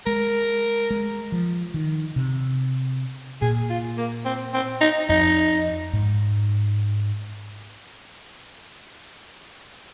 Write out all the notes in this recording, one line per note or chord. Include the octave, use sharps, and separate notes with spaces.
G#3 A#4
G#3
F3
D#3
C3
A#2 G#4
F4
A#3
C4
C4
D#4
F2 D#4
G#2